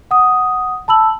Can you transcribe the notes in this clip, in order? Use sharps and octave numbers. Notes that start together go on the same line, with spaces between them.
F#5 D#6
A5 B5 E6 F#7